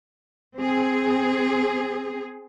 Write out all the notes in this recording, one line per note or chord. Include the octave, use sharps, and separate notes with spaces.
C4 G#4